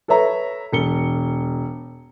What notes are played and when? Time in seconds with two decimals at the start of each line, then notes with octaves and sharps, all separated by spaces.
0.08 A4 B4 C#5 E5 A#5
0.72 E1 C#7 G7